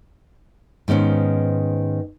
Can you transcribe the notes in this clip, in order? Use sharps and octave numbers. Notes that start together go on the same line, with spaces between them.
G#2 D#3 B3 C#4 C5